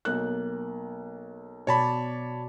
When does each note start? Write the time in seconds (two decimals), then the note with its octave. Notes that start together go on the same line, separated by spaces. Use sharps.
0.05 B1 A#3 F#6
1.67 B2 F#4 C#5 D5 A5 B5